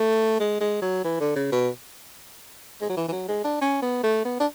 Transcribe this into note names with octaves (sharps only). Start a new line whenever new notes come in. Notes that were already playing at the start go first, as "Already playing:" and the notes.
Already playing: A3
G#3
G#3
F#3
E3
D3
C#3
B2
G#3
F#3
E3
E3
F#3
G#3
D4
C#4
B3
A3
B3
D4